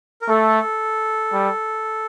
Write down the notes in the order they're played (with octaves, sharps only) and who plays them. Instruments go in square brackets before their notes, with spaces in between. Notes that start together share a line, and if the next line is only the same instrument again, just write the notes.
[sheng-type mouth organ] A#4
[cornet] A3 [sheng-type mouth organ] A4
[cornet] G3